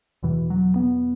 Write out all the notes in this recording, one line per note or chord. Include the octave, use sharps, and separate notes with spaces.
E2 B2 E3
F#3
B3